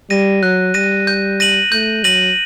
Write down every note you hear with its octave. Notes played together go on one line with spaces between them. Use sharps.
G3 A#6 D#7
F#3 F#6
G3 A#6 D#7
G6
A#6 D#7 F#7
A3 G6
F#3 A#6 D#7 F#7